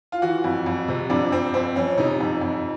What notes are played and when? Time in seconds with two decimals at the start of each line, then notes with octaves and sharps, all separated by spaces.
0.12 F4
0.22 E3 F#4
0.44 F2
0.66 F2
0.88 C3
1.10 F2 D4
1.32 F2 C4
1.54 F2 C4
1.76 F2 C#4
1.97 C3 D#4
2.20 F2
2.41 F2